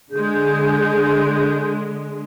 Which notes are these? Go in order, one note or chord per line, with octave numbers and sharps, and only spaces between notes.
D3 G#3 G#4 G6